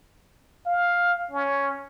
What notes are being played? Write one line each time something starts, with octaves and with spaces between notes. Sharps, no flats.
F5
C#4